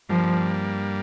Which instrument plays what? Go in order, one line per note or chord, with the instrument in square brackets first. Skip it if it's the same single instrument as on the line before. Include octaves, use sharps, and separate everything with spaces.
[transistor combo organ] G2 G3 A#3 [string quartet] F3